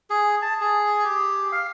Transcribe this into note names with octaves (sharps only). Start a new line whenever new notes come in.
G#4
A5
G#4
G4
F5